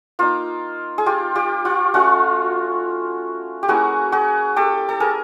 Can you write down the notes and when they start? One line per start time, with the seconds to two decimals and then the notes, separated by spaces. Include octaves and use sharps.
0.19 A#3 D#4 F4
0.98 G#4
1.06 F4 G4
1.35 F4 G4
1.65 F4
1.94 A3 C#4 F4 F#4
3.63 G4
3.68 A#3 C#4 E4 F#4 G#4
4.12 F#4 G#4
4.56 G4 A4
4.89 A4
5.00 G#4 A#4